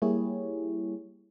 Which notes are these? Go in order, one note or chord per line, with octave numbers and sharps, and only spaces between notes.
G3 A#3 E4 G4 G#4 C#5